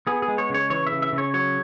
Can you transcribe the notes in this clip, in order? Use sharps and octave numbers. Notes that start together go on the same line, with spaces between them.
B3 G#4
G#4
G#3
C#5
C#3 C#5
E3 C#5
E5
C#3
E5
C#3
C#5
F#3 C#5